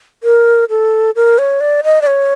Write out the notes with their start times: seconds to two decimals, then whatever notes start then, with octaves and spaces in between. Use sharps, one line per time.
0.23 A#4
0.70 A4
1.16 A#4
1.38 C#5
1.61 D5
1.84 D#5
2.02 D5
2.07 C#5